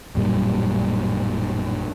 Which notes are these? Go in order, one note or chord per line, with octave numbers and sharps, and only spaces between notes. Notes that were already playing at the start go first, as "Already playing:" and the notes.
A1 F#2 A#2 G3